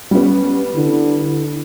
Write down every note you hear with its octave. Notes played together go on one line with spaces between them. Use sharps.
G3 B3 C#4
D3 E4